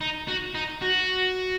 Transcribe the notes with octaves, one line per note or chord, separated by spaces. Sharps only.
D#4
F#4
D#4
F#4